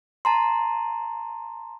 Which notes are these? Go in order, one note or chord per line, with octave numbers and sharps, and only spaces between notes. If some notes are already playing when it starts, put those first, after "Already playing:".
A5 A#5 C6